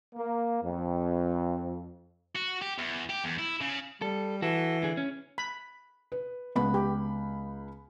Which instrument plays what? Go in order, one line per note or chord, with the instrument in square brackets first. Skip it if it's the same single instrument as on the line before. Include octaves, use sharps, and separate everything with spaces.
[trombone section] A#3
F2
[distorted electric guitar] F#4
G4
E2
G4
E2
E4
C#3
[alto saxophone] G3 [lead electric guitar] A4
[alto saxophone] E3 [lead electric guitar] F#4 A4
[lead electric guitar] D3 G#4
C#4
[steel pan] B5
[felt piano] B4
[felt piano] C#2 B5 [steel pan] B3
[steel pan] G4